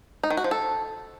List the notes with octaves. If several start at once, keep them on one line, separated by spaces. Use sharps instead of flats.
D#4
D#3
F#4
F3
A4